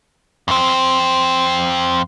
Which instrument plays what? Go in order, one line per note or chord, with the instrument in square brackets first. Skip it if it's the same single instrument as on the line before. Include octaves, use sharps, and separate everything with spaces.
[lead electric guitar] F2 C4